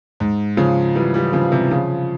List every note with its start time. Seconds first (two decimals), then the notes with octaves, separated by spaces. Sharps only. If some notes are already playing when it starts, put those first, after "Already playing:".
0.20 G#2
0.57 C#3 F3
0.95 E3 G3
1.14 E3 G3
1.33 C#3 F3
1.52 C3 E3
1.71 C#3 F3